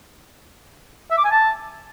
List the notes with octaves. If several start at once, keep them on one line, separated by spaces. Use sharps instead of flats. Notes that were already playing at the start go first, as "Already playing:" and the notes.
E5
D6
G#5
A5